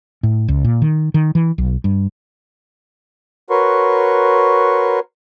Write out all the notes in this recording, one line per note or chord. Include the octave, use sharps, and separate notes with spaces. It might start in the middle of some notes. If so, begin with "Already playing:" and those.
A2
C#2
A#2
D#3
D#3
E3
B1
G2
F#4 A#4 B4 C#5 C6 C#6